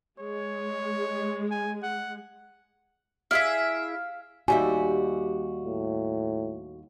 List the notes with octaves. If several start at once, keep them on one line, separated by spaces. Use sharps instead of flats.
G#3 C#5
G#5
F#5
E4 G#4 E5 F5
D#2 G3 F#4 E5 G#5
A2